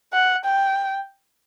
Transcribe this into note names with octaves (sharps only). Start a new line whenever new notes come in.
F#5
G5